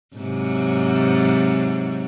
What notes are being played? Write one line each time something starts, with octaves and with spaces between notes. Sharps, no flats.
G#2 C3 F#3